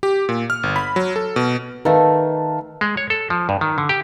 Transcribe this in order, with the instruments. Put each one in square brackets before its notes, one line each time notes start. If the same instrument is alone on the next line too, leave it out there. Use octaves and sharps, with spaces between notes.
[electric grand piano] G4
A#2
F6
G1
B5
F#3
A4
B2
[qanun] D#3 A3 [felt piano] B4 F5 A5
[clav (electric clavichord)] G#3
C#5
A4
F3
G2
D#3
D3
G4